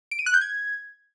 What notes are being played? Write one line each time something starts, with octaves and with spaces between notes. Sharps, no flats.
D7
D#7
F#6
G6
G#6